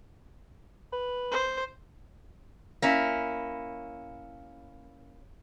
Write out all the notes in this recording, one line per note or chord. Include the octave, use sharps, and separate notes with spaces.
B4
C5
A#3 C#4 E4